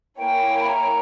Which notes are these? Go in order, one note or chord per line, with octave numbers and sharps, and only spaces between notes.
A#3 E4 A#4 C#5 G5 G#5
B5
A#5